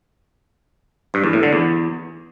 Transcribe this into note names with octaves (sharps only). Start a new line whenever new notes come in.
G2
E2
A2
D3
E2